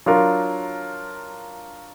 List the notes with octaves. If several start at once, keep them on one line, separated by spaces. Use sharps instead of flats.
F#3 D4 F4 A#4